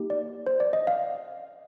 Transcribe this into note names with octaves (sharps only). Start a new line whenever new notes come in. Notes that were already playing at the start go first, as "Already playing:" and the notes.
Already playing: A#3 D#4 G4
D5
C5
D5
D#5
F5